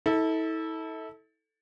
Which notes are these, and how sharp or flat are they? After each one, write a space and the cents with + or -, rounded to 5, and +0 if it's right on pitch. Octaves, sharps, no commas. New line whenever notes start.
E4 -40 A4 +0